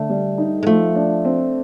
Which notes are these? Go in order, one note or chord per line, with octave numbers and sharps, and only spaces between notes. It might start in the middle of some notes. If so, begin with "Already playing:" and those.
Already playing: D3 A3
G3
D#4
G#3
F3 A3
D4
C4